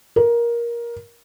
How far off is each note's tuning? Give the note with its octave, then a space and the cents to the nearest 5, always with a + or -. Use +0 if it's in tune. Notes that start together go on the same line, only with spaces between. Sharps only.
A#4 +15